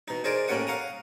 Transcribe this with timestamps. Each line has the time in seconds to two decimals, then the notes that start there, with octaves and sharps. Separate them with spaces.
0.08 B2 D#4
0.24 D#4 G#4 A#4 C5 D5
0.48 A2 A#3 C#4 G4 F#5 D#6
0.67 F5 F#5 A#5 D#6